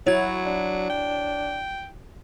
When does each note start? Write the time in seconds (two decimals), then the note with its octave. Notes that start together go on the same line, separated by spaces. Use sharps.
0.07 F#3 E4 F#4 C#5 G#6
0.46 D4
0.90 G5